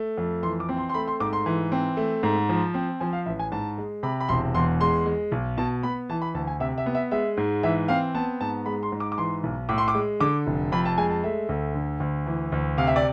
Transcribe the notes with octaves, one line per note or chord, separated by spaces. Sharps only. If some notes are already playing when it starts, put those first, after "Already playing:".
Already playing: A3
F2
E3 C6
D6
C4
C6
C6
A3 B5
C6
G#2 D6
C6
E3
C4
A3
G#2
F3
C4
F3 G#5
F5
A1 E5
G#5
G#2 A5
G#3
C3 B5
B5
E1 C6
E2 C6
G#3 C6
G#3
B1
B2 A5
B3 B5
E3 A5
B5
D2 A5
G#5
C3 E5
E5
B3
E5
G#3 E5
G#2
E3 E5
C4 F5
B3 A5
G#2 A5
G#3 B5
C6
G#2
D6
D6
E3 C6
B1
A2 D6
C6
D6
G#3
D3 D6
F1
F2 B5
A5
G#3 G#5
A5
A3 E5
D2
D3
D2
E3
D2
C3 F5
E5
D5